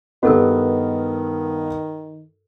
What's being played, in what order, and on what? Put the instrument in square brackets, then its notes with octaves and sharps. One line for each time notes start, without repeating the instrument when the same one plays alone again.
[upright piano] G2 B3 [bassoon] D#3 [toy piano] F#4 A4 A#4